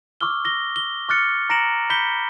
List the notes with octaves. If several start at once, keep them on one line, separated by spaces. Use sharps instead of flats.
C#6 D6 E6 F6 G7
A#6 G7
G7
C#6 D6 F6 F#6 A6 C#7
A#5 A#6 C#7 D7 E7 F#7
B5 G6 B6 C#7 G7